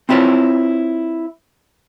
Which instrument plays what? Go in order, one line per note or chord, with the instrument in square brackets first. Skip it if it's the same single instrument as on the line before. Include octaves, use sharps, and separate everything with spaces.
[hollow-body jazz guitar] C4 E4 F4 B4 C#5